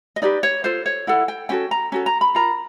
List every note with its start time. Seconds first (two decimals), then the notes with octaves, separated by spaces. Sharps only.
0.16 D#5
0.22 D#4 G4 B4 D5
0.43 C#5
0.64 F4 A4 C5
0.86 C#5
1.07 E4 A4 F#5
1.28 G5
1.49 C#4 F#4 A4 G5
1.71 A#5
1.92 C#4 F#4 A4
2.06 A#5
2.21 B5
2.35 F4 A#4 A#5